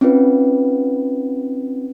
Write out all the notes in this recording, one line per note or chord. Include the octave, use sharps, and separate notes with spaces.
C4 C#4 D#4 F4 B4